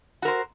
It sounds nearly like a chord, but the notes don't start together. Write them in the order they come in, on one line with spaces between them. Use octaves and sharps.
F#4 A#4 C5